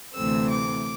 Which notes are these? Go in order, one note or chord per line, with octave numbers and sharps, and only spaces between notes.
D2 C3 E3 A3 C4 E6
D6